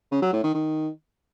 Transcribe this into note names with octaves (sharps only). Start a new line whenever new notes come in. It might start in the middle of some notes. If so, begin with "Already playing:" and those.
C#3
F#3
A2
D#3
D#3